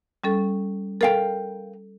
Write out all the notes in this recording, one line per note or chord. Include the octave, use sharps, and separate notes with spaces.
G3 C#4 A4
A4 A#4 F5 G5